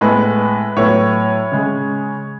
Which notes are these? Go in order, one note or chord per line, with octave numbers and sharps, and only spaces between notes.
A2 G#3 B3 B4
A2 F#3 B3 C#5
C#3 G#3